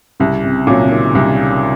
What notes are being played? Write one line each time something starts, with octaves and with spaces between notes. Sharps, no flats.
C2 C#3
C3
A#2 C#3 F#3
C#3
D#3
C2 C#3